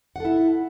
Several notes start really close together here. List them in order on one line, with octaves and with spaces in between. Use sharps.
F#5 A4 E4